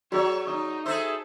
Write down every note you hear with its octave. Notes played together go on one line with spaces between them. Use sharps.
F#3 F#4 G#4 C#5 D5
D#4 C#6 D#6
G#4 A4 C5 E5